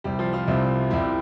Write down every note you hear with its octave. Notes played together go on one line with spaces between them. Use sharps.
C2 C3 G3 G4
F3 F4
F3 F4
C2 C3 G3
C2 C3 G3 E4